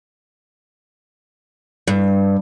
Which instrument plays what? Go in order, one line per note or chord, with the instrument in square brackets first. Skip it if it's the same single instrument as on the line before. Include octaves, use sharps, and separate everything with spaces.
[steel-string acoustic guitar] G2